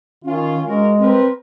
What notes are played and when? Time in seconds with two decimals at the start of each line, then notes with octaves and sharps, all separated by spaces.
0.24 D#3 C#4 F4
0.64 G#3 F4 F#4 A#4
0.99 G3 C4 A#4 B4